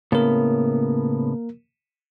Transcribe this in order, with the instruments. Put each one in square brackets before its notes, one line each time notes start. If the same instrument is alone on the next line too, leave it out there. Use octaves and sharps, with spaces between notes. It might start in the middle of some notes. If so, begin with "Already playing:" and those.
[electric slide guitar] A2 C#3 B3 [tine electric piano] A#3 A#4